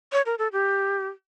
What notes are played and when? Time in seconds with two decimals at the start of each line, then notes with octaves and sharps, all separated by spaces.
0.13 C#5
0.26 A#4
0.39 A4
0.52 G4